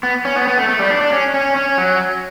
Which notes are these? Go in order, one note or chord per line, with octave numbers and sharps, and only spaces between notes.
B3
C#4
B3
B3
A3
A3
G3
D4
D4
C#4
C#4
C#4
F#3